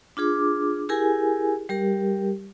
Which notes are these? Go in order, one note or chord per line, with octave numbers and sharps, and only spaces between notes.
D4 F4 G#4 D6
E4 G4 G#4 A#4 G#5
G3 G4 A#4